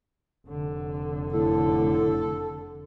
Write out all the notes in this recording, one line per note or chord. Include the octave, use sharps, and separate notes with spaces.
F1 D3
A2 A4